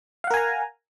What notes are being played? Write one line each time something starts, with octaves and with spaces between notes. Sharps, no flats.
A#4 F5 F#5 G#5 A#5